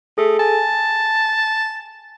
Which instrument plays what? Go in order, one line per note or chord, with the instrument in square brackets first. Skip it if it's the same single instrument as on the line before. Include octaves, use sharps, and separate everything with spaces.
[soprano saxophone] A3 [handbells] G#4 A4
[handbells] G#5 [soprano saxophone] A5